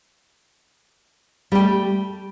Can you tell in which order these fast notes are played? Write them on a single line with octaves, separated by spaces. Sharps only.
G3 G4 A3